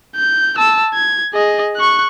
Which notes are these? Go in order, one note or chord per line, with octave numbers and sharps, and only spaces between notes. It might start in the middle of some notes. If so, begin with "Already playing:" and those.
G6
A5 E6
G#6
G#4 D#5
C#6 F#6